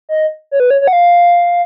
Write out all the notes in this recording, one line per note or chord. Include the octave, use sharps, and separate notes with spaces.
D#5
C#5
B4
C#5
C#5
F#5
F5